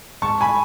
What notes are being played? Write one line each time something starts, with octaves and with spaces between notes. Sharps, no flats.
G#2 A5 C#6
G#5 B5